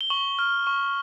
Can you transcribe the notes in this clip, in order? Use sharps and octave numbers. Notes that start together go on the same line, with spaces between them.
G7
C#6 F#7
F6
C#6